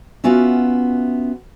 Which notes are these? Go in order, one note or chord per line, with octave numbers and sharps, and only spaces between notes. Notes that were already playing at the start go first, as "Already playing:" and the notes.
B3 C#4 F4 F#4 E5